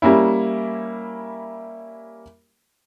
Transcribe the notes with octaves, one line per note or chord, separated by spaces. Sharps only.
G3 A#3 C#4 E4